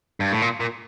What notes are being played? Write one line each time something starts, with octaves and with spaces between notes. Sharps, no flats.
G2
A2
A#2
A#2